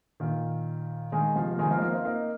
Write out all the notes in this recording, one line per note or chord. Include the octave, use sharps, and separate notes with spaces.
A#2 D#3
D#3 G#3
C3 F3
A#3
D#3 G#3
F3 A#3
C4
A#3 D#4
C4 F4
A#3 D#4